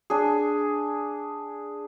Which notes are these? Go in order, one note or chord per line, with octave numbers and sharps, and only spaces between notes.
D4 G#4